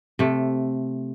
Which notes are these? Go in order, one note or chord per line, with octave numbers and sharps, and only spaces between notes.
C3 A3